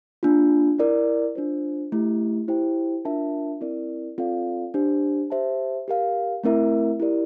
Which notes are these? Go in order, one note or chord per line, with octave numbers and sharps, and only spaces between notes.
A#3 D4 F4
E4 A#4 D5
D4 F4 C5
A3 E4 G4
E4 G4 C5 G5
D4 F4 A#4 E5 A5
C4 E4 A#4 D5
C4 F4 A4 D5 F5
D4 G4 C5
G4 C5 E5 A5
G4 A#4 F5
A3 C4 E4 A#4 E5
E4 G4 A#4 D5